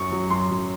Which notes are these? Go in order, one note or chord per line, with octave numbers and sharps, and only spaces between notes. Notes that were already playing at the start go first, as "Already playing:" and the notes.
Already playing: F#2 C#6
F#3
F#2 C6
F#2